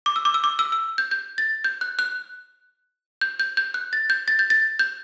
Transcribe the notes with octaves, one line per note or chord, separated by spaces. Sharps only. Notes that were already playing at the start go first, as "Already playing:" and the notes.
D6
E6
D6
E6
D6
E6
E6
G6
G6
A6
G6
F#6
F#6
G6
G6
G6
F#6
A6
G6
A6
G6
A6
G6